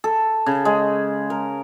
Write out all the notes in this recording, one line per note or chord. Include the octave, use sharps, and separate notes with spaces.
A4
C#3
G#3
A#4